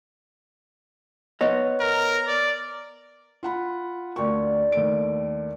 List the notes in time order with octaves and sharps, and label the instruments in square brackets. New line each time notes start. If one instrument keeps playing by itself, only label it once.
[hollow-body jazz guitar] B3 C#5 D#5
[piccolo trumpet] A#4
D5
[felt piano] F4 F#5 B5
[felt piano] D2 C#6 [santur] A#3 C4 D4
[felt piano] D#2 A3 D7